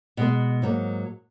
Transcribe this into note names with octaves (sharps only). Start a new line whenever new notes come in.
B2 G#3 B3
G#2 F#3 A#3